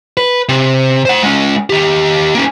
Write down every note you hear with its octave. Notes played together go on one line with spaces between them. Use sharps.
B4
C3
C5 F#5
G#3 C#4
D#3 G4
A#3 C#4